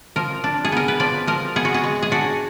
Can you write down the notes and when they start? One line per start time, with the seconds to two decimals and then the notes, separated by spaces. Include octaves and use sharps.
0.16 F3 A#4
0.44 D4
0.65 G#4
0.72 B3 A#4
0.88 B4
1.00 F3 D5
1.27 F3 A#4
1.56 B3 G#4
1.65 F#4
1.74 G#4
1.84 G#3
2.03 G#4
2.12 D4 F#4